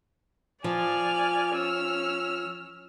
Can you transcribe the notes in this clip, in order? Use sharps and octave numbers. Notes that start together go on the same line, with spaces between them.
F3 D5 G#5 F6
C#4 E6 F6